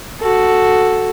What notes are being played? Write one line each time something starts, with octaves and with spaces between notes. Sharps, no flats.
F#4 A4